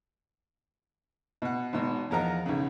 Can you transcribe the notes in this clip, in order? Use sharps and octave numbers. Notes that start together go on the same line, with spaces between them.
B2 F#5
G#1 B2
E2 F3 A#4 D#5 F#5 A#5
B1 C#3